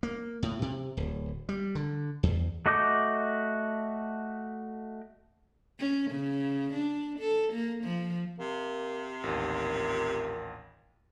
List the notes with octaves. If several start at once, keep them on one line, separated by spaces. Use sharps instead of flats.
A#3
A2
C3
D1
G3
D3
E2
A3 F#4 D#5 D6 G6
C#4
C#3
D4
A4
A#3
F3
C3 A#3
A1 D#2 A#2